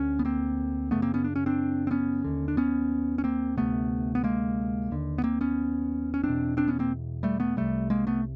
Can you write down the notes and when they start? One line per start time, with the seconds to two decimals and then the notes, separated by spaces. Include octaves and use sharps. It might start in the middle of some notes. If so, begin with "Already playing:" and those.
Already playing: D2 D3 C#4
0.19 B3
0.25 A#3 C4
0.91 F#2 C#3 A3 B3
1.02 A#3 C4
1.14 B3 C#4
1.24 D4
1.36 C#4
1.46 C4 D4
1.87 C4
1.91 B3 C#4
2.24 D#2 D3
2.48 D4
2.57 B3 C#4
3.18 C#4
3.24 A#3 C4
3.57 D2 C3 A3 B3
4.15 B3
4.24 G#3 A#3
4.91 D#2 D3
5.18 B3
5.24 A#3 C4
5.41 B3 C#4
6.14 C#4
6.23 E2 C4 D4
6.29 B2
6.57 C4 D4
6.68 B3 C#4
6.79 A#3 C4
7.23 G3 A3
7.40 A3 B3
7.57 C2 C3 G3 A3
7.90 G#3 A#3
8.07 A3 B3